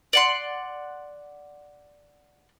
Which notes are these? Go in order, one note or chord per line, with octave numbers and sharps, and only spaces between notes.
D5 F#5 C6